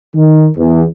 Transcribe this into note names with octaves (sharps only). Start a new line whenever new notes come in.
D#3
E2